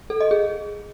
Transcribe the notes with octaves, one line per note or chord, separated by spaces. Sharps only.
A4
D#5
G#4